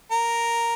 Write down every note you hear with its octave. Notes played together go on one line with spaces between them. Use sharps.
A#4